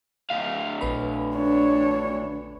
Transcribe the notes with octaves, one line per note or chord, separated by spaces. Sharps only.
D2 F5
A#1 B4 B5
D4 C#5